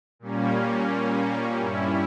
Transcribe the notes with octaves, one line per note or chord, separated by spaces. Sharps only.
A#2 G3 A#3 C#4
G2 G3 C#4 E4